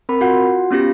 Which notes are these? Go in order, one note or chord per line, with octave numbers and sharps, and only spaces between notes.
C4 A#4 B5
F4 F#4 F#5
B3 C#4 F4 G4 A#6